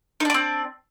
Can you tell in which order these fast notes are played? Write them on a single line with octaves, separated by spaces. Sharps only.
D#4 D4 D5 C4